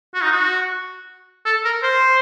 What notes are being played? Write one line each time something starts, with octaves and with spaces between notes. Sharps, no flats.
F#4
D#4
F#4
A4
A#4
C5